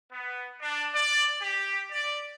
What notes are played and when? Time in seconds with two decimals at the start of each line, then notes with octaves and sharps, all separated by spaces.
0.11 B3
0.61 D4
0.94 D5
1.41 G4
1.91 D5